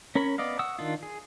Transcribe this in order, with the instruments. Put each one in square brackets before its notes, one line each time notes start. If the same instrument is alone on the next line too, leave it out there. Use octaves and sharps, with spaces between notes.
[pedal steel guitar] C#4 A#4 C#5 B5
B3 D5 D#5 F5
F#5 C#6 D#6 E6
D#3 D4 F4
G#4